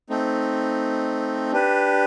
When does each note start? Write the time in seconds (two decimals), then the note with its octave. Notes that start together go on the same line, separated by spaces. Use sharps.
0.10 A3 C4 D#4
1.52 D4 G4 B4